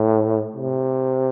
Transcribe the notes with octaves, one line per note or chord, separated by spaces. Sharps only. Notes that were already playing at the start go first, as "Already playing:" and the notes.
Already playing: A2
C3